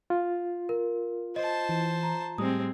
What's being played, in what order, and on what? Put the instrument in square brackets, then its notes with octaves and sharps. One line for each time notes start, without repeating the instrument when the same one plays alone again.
[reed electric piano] F4
[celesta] A#4
[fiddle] C5 A5 [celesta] D#5
[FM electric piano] E3
[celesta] A#5
[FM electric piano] A2 G3 [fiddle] G#3 C4 [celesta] D#6